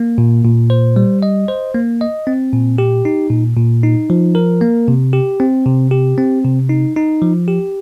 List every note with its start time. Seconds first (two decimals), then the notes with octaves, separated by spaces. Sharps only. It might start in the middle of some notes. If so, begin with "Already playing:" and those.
Already playing: A#3
0.18 A#2
0.44 A#2
0.70 C5
0.96 G3
1.23 D#5
1.48 C5
1.75 A#3
2.01 D#5
2.27 C4
2.53 A#2
2.78 G4
3.05 D#4
3.30 A#2
3.57 A#2
3.83 D#4
4.10 F3
4.35 A#4
4.61 A#3
4.88 C3
5.13 G4
5.40 C4
5.66 C3
5.91 G4
6.18 C4
6.44 C3
6.69 D#4
6.96 D#4
7.22 F3
7.48 G4